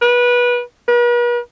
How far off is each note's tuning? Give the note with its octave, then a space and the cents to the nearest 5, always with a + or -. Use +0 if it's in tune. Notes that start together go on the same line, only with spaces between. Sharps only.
B4 -25
B4 -45